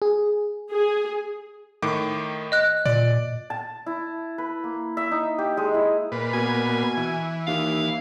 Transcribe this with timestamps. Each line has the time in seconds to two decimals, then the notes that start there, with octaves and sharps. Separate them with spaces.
0.02 G#4
0.71 G#4
1.82 A2 D#3 D6
2.52 D#5 F#6
2.86 A#2 D5
3.50 A5
3.86 E4
4.38 B4
4.64 A#3
4.97 E5
5.11 D#4
5.38 G4
5.57 G#3
5.74 E4
6.12 A#2 B4
6.34 B2 G#5
6.97 E3
7.47 D#2 F5